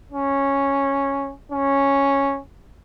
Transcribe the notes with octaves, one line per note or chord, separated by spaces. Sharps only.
C#4
C#4